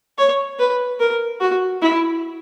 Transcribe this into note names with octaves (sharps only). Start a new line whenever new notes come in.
C#5
B4
A#4
F#4
E4